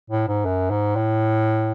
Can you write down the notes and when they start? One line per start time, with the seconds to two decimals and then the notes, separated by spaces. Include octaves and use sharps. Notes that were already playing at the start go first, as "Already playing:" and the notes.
0.10 A2
0.28 G#2
0.45 F#2
0.70 G#2
0.96 A2